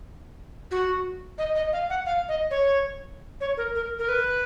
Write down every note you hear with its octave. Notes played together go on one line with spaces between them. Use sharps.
F#4
D#5
D#5
F5
F#5
F5
D#5
C#5
C#5
A#4
A#4
A#4
B4